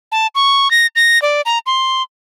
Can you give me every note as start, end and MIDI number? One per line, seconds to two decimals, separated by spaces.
0.12 0.27 81
0.35 0.71 85
0.71 0.87 94
0.96 1.21 94
1.22 1.42 74
1.46 1.59 82
1.66 2.03 84